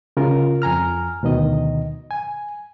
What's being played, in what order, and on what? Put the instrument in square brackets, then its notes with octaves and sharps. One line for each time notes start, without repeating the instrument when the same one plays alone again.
[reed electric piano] C#3 F4 A#4
F2 G#5 A#5 F6
D2 B2 D#3 D#5
G#5